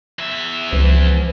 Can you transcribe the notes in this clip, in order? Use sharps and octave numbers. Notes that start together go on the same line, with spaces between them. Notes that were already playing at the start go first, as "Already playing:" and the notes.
E2 E5
C#2 E3 F3